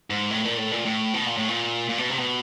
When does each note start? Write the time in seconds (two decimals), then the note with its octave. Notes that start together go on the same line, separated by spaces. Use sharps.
0.10 G#2
0.31 A2
0.45 A#2
0.57 A2
0.71 A#2
0.85 A2
1.14 B2
1.26 A#2
1.37 A2
1.48 A#2
1.89 A#2
1.98 B2
2.10 C3
2.19 B2